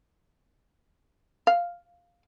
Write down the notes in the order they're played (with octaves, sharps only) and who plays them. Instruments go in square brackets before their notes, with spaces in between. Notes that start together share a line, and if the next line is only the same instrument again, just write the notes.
[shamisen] F5